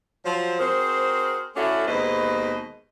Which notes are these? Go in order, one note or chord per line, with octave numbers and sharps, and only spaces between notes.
F3 F#3 C5
C4 F#4 G#4 A#4 C5
A3 C#4 D4 E4 F#4 A4
D#2 B2 G#3 B4 C5 D#5